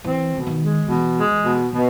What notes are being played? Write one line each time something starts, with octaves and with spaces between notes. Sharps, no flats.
E3 C4
B2 D3
D#3
G#3
B2 E3
G#3
E3
B2
B2 D3